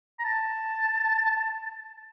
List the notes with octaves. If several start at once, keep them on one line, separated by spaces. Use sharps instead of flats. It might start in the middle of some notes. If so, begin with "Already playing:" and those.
A#5
A5